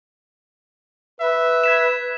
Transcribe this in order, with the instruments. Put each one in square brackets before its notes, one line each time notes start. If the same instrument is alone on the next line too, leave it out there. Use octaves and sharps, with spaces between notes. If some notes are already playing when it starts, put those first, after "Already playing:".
[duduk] B4 [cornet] E5
[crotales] G#6 B6 E7